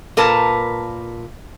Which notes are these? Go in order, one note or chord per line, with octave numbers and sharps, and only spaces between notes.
A#2 A#4 B4 A5